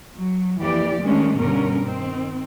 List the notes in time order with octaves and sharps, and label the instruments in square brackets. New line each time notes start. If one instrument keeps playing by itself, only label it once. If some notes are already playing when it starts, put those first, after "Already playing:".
[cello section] F#3
F2 E3 A#3 G4 D5
D#3 G#3 A3 C#4 D4
G2 B2 D3 C#4 A#4
D#3 C4